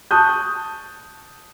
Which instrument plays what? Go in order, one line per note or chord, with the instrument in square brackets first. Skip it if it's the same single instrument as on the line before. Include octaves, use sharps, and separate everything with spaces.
[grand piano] A5 C#6 D#6 F#6 G6